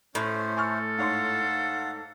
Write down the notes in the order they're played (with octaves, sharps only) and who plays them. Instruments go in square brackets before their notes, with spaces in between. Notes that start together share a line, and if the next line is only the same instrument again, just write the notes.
[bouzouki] A2 [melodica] A3 C5 [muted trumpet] C#4
[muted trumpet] A4 [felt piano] G#5 C#6 F6
[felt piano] G#2 C#5 C6 [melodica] F5 F#5